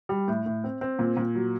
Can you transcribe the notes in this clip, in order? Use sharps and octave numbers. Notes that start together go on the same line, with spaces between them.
G3
A2
A2
C4
C4
A#2
A#2
F#3